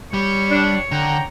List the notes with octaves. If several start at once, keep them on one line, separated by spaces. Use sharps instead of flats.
G3 C#5
D4
D3 G5 A#5